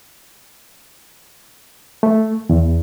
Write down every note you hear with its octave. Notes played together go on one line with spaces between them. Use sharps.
A3
E2